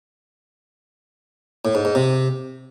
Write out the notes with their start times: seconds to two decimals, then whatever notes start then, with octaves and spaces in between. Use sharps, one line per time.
1.65 A2
1.75 G#2
1.85 G#2
1.95 C3